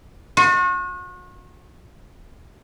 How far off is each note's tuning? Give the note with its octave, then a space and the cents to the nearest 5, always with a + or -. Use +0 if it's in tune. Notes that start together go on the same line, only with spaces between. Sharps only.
F#4 -40